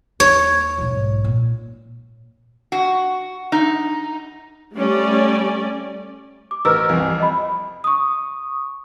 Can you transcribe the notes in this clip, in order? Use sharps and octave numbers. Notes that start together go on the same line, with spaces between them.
D#2 C#5
B1 G#2
A#2
F#4
D#4
G3 A3 C#4 D5
D6
A1 A#4 C5 E6 F6
C2 F2 E3
D#5 B5
C#6 D#6